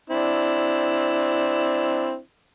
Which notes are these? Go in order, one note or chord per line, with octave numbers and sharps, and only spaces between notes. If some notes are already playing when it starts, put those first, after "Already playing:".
C4 D4 E4